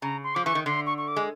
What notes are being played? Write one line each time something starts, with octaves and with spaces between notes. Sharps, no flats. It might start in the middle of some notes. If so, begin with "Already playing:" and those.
C#3 A#5
C6
F3 D6
E3 C#6
D#3
D3 C6
C#6
C#6
D6
G#3